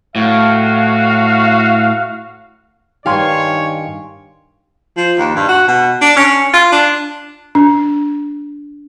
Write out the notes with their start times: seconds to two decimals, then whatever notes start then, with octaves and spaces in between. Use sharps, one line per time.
0.16 A2 F#4 F5
3.06 G2 D#3 G4 C#5 F5 G#5 C6
4.97 F3
5.19 D#2
5.36 G2
5.49 F#4
5.68 B2
6.01 D4
6.17 C#4
6.54 F4
6.72 D4
7.55 D4